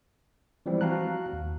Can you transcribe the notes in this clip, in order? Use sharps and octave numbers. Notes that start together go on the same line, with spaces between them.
E3 F3 G3 G#3 C4 E4
F#4 F5 A5 A#5 F#6
D#2